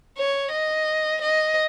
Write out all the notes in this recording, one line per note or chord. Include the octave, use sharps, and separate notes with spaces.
C#5
D#5
D#5